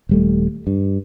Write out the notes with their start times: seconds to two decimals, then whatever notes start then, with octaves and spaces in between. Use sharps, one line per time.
0.09 D#1 G3 A3
0.67 G2